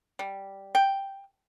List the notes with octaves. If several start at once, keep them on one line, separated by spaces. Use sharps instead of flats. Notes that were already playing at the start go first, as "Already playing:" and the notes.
G3
G5